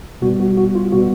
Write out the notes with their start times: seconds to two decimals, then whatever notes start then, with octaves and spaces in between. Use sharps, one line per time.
0.22 B2 G3 B3 F#4
0.40 F#4
0.57 F#4
0.75 F4
0.93 B2 G3 B3 F#4